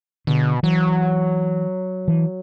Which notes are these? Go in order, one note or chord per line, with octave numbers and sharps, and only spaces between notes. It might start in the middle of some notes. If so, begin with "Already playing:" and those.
B2 D3
E3 F#3
E3